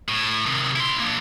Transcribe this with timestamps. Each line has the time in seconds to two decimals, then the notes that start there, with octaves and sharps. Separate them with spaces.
0.08 A2
0.46 C3 D#3
0.76 E4 C6
1.00 A#3 D4